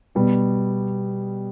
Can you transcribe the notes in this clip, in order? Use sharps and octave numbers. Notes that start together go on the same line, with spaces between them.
B2 G3 B3